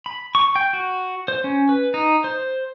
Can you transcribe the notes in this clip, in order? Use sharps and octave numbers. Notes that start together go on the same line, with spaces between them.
B5
C#6
G5
F#4
C5
C#4
B4
D#4
C5